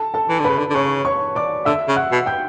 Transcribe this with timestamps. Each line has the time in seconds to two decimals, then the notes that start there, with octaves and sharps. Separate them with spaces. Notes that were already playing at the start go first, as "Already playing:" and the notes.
Already playing: A4 A5
0.14 A4 A5
0.29 E3
0.40 D3
0.45 C#3 B4 B5
0.59 D3
0.70 D3
0.75 C#3 C#5 C#6
1.05 C#5 C#6
1.35 D5 D6
1.65 D3 E5 E6
1.88 C#3
1.96 F#5 F#6
2.12 B2
2.26 G5 G6